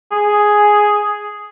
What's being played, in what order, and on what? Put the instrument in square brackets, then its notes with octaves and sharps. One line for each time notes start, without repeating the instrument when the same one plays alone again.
[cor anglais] G#4